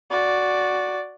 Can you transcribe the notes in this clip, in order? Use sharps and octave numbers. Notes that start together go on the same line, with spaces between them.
F#4 D5